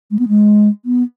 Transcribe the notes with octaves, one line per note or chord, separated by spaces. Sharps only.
G#3
B3
G#3
B3